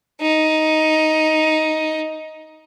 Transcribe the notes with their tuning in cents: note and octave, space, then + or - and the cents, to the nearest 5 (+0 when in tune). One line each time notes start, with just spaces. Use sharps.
D#4 +10